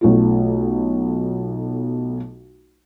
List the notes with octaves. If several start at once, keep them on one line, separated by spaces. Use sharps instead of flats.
B1 A3 F4